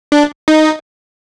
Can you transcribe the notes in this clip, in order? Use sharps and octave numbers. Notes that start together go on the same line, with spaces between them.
D4
D#4